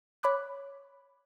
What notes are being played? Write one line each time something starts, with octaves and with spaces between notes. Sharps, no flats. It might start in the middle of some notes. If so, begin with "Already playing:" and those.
C#5 B5 D6 F#6